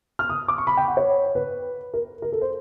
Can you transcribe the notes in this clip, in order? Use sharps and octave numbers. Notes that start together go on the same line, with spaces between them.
F6
D#6
D6
C#6
B5
G5
F#5
C#5
B4
A#4
A#4
A4
C5